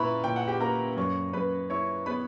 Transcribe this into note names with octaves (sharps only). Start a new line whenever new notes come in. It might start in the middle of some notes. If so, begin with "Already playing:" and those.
Already playing: A#2 E4 B4 A#5 B5 C#6
A#2 G5
F#5
G4 G5
A#3 A#4 A#5
F#2 C#5 C#6
F#2 B4 B5
E4 C#5 C#6
B3 B4 B5